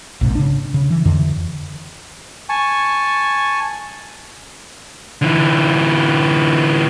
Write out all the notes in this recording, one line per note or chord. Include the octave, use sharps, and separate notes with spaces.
A#1 G#2 C3
C#3 D4
C#3
E3
F2 D3 E3
G#5 A5 C#6
D3 E3